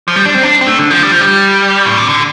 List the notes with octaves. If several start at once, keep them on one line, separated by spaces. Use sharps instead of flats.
F3
G3
D4
C4
D4
C4
A3
D3
F3
G3
F3
G3
A2
C3
D3